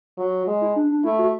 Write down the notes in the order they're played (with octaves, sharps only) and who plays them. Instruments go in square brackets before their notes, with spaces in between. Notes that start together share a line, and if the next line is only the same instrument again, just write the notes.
[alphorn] F#3
G#3
[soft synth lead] E4
D4
D4
[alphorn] A3 [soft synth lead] E4
[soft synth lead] F#4